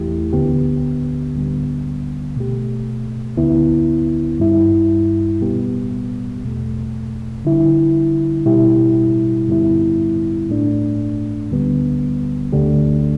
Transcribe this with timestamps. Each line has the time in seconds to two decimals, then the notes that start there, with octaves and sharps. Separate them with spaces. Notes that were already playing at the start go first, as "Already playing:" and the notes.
Already playing: E2 E3 A3 E4 G4
0.33 D2 D3 B3 G4
1.35 D2 D3 G3 B3
2.36 B2 A3 G4
3.37 D2 D3 B3 E4
4.40 G2 G3 E4
5.41 B2 G3 B3 G4
6.43 E2 B2 A3
7.45 D3 G3 E4
8.46 B2 G3 E4 G4
9.48 G2 D3 G3 B3 E4
10.50 A2 A3 D4
11.51 D2 D3 G3 B3
12.52 D2 D3 A3 D4 G4